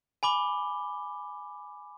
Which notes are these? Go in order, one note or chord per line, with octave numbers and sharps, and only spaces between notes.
G#5 B5 D6 G7